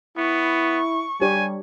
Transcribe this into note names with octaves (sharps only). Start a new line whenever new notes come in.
B3 E4 C#6
G3 D4 G4 C#5 G#5